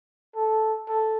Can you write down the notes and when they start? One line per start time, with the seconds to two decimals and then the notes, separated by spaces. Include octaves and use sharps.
0.36 A4
0.89 A4